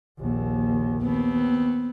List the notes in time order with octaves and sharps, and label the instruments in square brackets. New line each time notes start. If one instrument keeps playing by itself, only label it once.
[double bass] A#1 D#2
[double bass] D#2 [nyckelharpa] B3 C4